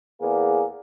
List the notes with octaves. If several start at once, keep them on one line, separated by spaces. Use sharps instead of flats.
E2 A#3 G#4